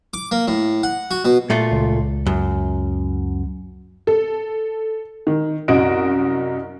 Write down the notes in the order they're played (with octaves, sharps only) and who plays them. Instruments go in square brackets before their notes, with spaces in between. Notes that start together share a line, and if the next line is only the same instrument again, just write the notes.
[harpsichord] D6
A#3
A2
F#5
F#4
B2
[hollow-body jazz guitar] A#2 A3 F4
[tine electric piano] C#2
[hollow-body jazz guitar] F#2
[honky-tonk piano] A4
D#3
C2 F#2 F#4 D#5 D7